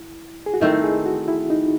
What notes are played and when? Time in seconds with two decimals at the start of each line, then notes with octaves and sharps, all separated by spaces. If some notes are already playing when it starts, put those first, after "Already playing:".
Already playing: E4
0.46 G#4
0.54 F#4
0.60 D#3 A3 C4 E4
0.83 G#4
1.06 F#4
1.28 E4
1.50 D#4